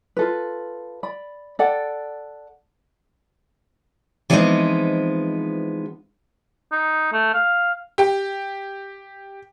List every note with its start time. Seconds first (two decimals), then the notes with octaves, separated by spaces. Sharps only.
0.17 F4 A4 B4
1.03 D5 B5
1.59 A4 D5 F#5 G5
4.30 E3 F3 G#3 B3 C4 D#4
6.72 D#4
7.13 A3
7.34 F5
7.98 G4 G5